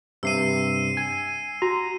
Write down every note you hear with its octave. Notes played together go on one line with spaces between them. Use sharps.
G2 C3 E6 C7 D#7
G#5
F#4 A#5